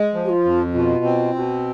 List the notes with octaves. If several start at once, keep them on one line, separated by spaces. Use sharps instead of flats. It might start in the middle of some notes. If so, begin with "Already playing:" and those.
Already playing: G#3
F3
G4
F4
F2
B2 F4
C4
B2